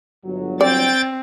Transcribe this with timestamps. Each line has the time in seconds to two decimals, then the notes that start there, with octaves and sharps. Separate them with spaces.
0.25 G1 F#3
0.61 C4 D5 G5 A6